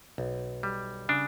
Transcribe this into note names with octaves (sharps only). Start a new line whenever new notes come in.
B1
G3
C#3 D4